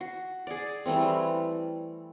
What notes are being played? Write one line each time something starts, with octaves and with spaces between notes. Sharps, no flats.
F#4
G#4 D5
E3 G3 A3 C4